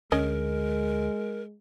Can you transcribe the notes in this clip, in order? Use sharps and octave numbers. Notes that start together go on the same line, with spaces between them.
D2 G#3 C#4 A#4 D#5